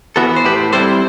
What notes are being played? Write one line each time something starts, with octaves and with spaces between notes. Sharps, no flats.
E3 B3 F#4 A4
C5
A2 G4 B4
G3 C4 E4 A4 C5